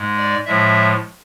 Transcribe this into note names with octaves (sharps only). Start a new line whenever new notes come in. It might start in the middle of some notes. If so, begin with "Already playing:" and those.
Already playing: G#2 G#3
D5
A2 F3 G#3 E5